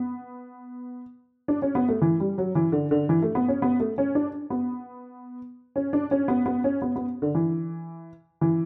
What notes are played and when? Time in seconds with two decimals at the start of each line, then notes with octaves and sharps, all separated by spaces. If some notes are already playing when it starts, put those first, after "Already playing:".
Already playing: B3
1.48 D4
1.62 C#4
1.75 B3
1.88 A3
2.01 E3
2.20 G3
2.38 F#3
2.55 E3
2.72 D3
2.91 D3
3.09 E3
3.22 A3
3.35 B3
3.48 C#4
3.62 B3
3.80 A3
3.98 C#4
4.15 D4
4.50 B3
5.76 C#4
5.93 D4
6.11 C#4
6.28 B3
6.46 B3
6.64 C#4
6.82 B3
6.96 B3
7.22 D3
7.35 E3
8.41 E3